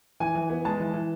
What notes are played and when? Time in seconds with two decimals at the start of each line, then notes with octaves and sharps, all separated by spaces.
0.20 E3 G#5
0.35 E3
0.50 B3
0.65 G#3 A5
0.80 E3
0.94 E3